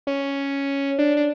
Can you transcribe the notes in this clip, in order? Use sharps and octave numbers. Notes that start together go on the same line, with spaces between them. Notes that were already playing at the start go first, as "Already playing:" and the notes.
C#4
D4
D4